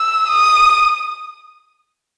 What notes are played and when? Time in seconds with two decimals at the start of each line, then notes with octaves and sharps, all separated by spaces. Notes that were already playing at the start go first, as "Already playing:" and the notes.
Already playing: E6
0.28 D#6